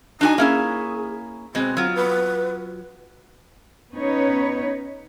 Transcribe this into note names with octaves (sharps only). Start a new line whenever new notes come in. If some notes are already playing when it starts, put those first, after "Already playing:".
D4 D#4 F#4 G#5
A#3 C#4 E4 G#4
B2 G#3 C4
F#3 F4
B4
B3 C#4 D#4 B4 C#5